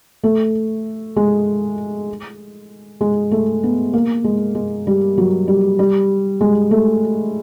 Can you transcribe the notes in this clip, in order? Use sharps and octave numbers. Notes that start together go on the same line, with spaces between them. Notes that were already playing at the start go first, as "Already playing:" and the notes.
A3
G#3
G#3
A3
B3
A#3
G#3
G#3
G3
F#3
G3
G3
G#3
A3